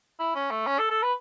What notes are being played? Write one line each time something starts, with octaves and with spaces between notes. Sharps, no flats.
E4
C#4
A3
C#4
A4
A4
B4